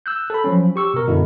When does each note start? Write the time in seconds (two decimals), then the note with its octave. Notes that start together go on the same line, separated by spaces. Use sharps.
0.06 E6 F#6 G6
0.30 A4 B5
0.44 F3 F#3 C#4
0.76 G4 C#6 E6
0.94 B2 A#4
1.08 F#2 B2 D3 B3 E4